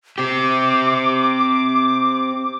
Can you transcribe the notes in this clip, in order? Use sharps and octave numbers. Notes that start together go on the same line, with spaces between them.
C4 G4 D6